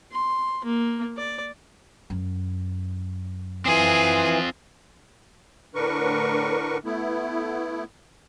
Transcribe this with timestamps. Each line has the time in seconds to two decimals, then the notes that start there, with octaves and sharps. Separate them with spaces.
0.12 C6
0.65 A#3
1.17 D5
2.10 F#2
3.66 E3 C4 F4 G#4
5.75 A2 D3 D4 A#4 B4 C#6
6.85 A3 B3 E4